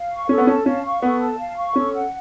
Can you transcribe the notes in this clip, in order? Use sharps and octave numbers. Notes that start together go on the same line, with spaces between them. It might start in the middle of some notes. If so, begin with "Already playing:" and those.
Already playing: F5
C#6
C#4 A4
B3
C#4 A5
C#4 F5
C#6
B3 A4
A5
F5
C#6
C#4 A4
F#5